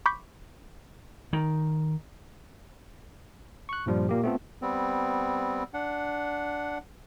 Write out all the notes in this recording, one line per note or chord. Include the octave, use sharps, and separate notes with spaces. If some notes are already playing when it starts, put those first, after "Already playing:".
B5 C#6 D6 G6 B6
D#3
C#6 F#6
G2 A#2 F3 G3
A#2 A#3 G4
A3 B3 C4 F4 A4
G3 B3 C4
D4 F#5